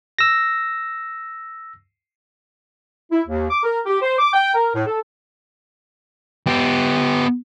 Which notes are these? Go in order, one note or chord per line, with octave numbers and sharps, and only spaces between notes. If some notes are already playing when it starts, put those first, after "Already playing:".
E6 A#6
E4
D#2
D6
A#4
G4
C5
D6
G5
A#4
A2
A4
B3 G4